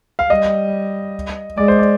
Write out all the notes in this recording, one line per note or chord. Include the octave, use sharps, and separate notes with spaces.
F5
G3 D#5
G#3 D5
C5
D5